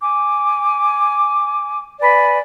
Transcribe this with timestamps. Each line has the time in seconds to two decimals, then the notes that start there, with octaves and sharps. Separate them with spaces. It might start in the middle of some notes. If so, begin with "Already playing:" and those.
0.01 G#5 D6
2.00 B4 D5 G#5 B5